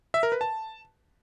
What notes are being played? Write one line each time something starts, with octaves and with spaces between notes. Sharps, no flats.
E5
A#4
B4
A5